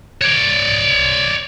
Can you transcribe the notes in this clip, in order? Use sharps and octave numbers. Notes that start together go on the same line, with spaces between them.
C#5 D5